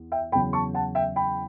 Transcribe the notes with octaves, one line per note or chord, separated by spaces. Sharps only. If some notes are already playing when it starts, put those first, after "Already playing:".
Already playing: E2
E5 G5
E2 C#3 F#3 G5 B5
A5 C#6
F#5 A5
E5 G5
G5 B5